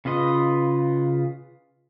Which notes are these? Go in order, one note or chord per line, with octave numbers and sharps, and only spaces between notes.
C#3 F4 B4 D#5